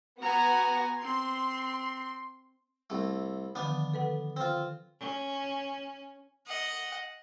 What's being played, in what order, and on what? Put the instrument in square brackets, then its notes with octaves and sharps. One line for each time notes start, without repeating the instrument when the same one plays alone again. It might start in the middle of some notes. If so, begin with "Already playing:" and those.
[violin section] B3 F#4 F#5 [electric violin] G#5 A#5
[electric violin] C4 [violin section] C6
[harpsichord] C2 A3
[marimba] D3 D#3 F3 [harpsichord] B3 D4
[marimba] A4 B4 F#5
[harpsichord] C4 F4
[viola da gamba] C#4
[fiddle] D#5 F#5